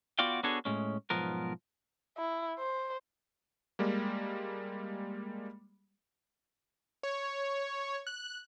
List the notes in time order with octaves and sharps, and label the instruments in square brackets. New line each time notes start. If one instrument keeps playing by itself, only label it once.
[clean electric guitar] B3 F4 F#4 D5 F5 G5
B3 D4 F#4 G#4 A4 C#5
A2 G#3 C#4
B1 G#2 F3 B3 A#4
[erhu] E4
C5
[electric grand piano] G3 G#3 A#3
[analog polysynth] C#5
F#6